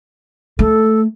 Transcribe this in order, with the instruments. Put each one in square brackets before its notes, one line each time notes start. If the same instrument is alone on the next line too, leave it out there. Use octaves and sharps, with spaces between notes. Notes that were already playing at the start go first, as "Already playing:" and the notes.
[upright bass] A3 [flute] A4